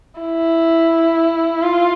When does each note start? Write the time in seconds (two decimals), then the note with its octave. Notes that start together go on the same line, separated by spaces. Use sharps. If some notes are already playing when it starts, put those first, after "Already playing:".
0.20 E4
1.62 F4